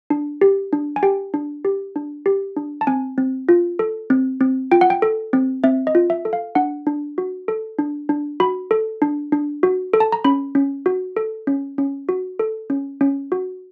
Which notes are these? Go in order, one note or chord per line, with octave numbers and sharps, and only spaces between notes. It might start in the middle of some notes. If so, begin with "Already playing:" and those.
D4
G4
D4
G#5
G4 G5
D4
G4
D4
G4
D4
A5
C4 G#5
C4
F4
A4
C4
C4
F4 G5
F#5
G5
A4
C4
C4 E5
D#5
F4
E5
A4
F5
D4 F#5
D4
F#4
A4
D4
D4
F#4 B5
A4
D4
D4
F#4
A4
A5
A#5
C#4 B5
C#4
F#4
A4
C#4
C#4
F#4
A4
C#4
C#4
F#4